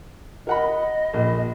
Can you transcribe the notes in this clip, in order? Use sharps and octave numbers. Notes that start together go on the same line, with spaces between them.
A#4 D#5 F#5 B5
A#1